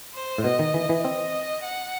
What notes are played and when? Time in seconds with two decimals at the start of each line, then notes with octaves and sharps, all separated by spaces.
0.14 C5
0.38 A2
0.44 B2 D#5
0.59 D#3
0.74 E3
0.89 E3
1.04 C4 D#5
1.64 F#5